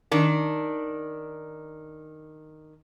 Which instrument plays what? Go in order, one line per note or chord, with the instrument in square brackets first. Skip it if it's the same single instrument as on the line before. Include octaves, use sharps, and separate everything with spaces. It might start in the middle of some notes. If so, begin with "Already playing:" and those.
[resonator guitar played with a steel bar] D#3 D4